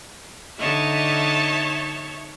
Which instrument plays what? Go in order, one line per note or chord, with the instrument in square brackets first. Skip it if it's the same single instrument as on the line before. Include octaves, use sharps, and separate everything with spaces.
[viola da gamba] D3 D#5 [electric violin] D#4 C#5 [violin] E5 A5